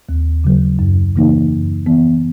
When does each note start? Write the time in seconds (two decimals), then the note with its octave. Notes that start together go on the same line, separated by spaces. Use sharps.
0.09 D#2
0.44 C#3 F#3
0.79 F#2
1.15 C#3 E3 A#3 D#4
1.51 F#2
1.86 E3 B3